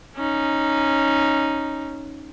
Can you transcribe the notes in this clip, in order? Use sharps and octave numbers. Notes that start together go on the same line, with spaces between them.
C#4 D#4